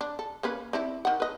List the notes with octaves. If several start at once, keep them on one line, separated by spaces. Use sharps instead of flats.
D4
A4
A#3 C#4 B4
C4 E4 D5
D#3 F#5
B4 D#5